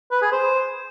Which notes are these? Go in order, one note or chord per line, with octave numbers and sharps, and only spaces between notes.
B4
G#4
C5